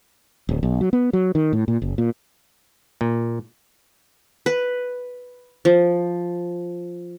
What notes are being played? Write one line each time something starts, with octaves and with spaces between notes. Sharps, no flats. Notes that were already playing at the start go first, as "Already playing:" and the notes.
D1
B1
F#3
B3
F#3
D#3
A2
A#2
F#1
A#2
A#2
B4
F3